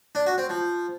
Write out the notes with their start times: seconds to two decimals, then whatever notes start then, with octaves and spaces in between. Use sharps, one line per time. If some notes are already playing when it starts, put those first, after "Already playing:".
0.15 D4
0.26 F#4
0.38 C4
0.49 F3